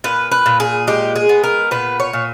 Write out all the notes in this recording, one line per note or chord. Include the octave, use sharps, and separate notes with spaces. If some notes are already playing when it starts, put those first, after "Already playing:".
A#2 B4
B4
A#2
G#4
G#3 G4
G#4
B3
A#4
A#2 B4
C#5
A#2